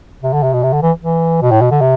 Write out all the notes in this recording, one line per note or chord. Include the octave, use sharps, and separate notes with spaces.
C3
D3
C3
B2
C3
D3
E3
E3
B2
A2
B2
D3
C3